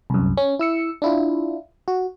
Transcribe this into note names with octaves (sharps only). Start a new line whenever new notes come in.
C2 F#2
C#4
E4 E6 C#7
D4 E4 F4
F#4